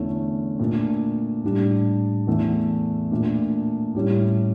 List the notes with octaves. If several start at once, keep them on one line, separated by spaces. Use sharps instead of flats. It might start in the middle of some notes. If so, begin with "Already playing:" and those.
Already playing: E2 D3 A3 C#4 E4
A#2 A3 D4
A2 G3 D4
E2 E3 A3 E4
A#2 A3 D4
A2 G3 C#4 E4